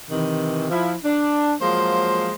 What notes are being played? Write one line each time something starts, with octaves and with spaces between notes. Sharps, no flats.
C3 D#3 E3
F3 E4
D4
F3 F#3 G#3 A#3 C5